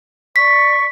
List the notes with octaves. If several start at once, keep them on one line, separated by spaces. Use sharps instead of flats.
D5 C#6 B6